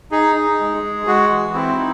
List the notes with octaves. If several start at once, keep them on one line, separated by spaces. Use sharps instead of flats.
D#4 G#4
D#4
G#3
G#3
G#3 F#4
E3
C4 E4
D#4